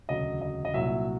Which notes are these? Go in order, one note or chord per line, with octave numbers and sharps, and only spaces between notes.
E1 D2 C#3 F#3 D#5
D#5
D#5
C2 A#2 F#3 E5